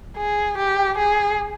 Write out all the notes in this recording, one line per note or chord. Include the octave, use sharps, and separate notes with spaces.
G#4
G4
G#4